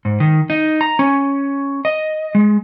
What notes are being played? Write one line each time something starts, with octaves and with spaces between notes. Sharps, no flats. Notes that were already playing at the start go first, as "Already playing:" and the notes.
G#2
D#3
D#4
A#5
C#4
D#5
G#3